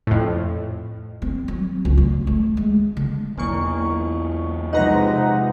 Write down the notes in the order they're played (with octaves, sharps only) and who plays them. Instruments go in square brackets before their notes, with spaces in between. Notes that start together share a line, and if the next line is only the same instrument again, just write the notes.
[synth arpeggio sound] F2 A2
[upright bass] C4
F#3
C#2
D2
A3
G#3
D3
[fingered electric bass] B1 E3 [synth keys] E2 A#3 C#6
[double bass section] C3 F3 G#3 [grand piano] D#4 B4 [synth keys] F#5 A#5 A#6